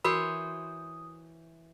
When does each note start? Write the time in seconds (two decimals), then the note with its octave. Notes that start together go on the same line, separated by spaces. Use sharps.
0.04 E3 F#4 A#4 C5 C#5 B5 D#6